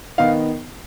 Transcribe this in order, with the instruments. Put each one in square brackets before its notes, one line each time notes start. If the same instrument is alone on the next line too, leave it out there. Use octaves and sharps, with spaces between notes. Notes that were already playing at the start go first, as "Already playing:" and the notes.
[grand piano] D#3 B3 D#4 F5